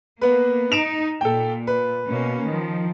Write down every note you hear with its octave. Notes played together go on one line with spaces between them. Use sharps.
A#3 B3 B4
D#4 D7 E7 F7
A#2 A4 G5
B4
B2 A#3 C#4
D#3 F3